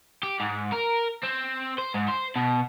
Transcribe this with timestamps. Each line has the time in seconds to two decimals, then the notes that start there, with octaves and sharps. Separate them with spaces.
0.23 G4
0.40 G#2
0.72 A#4
1.24 C4
1.78 C5
1.94 G#2
2.08 C5
2.36 B2